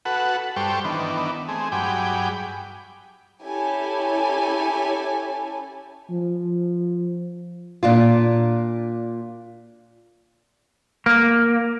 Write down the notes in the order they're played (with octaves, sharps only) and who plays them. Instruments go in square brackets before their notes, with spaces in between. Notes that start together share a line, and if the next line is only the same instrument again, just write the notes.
[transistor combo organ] F#4 A4 B4 F#5
G2 G3 A4 C5 G5 C#6
D#3 E3 B3 D4
A3 C4 G#4
G2 F#3 G#4 G5 B5 D6
[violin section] C#4 E4 G4 A4 C#5 G#5
[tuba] F3
[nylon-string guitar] A#2 D4 F4
[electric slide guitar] A#3